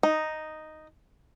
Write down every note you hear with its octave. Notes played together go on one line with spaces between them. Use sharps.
D#4